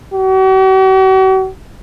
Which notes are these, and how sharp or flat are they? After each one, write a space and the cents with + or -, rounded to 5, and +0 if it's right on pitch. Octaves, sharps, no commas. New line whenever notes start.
F#4 +45